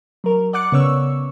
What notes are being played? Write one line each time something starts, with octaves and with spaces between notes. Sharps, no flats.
F#3 A#4
D5 F#5 D6 F#6 C#7
C#3 B3 C#5 C#6 E6